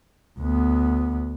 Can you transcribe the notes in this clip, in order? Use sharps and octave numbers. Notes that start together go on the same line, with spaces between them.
D2 B3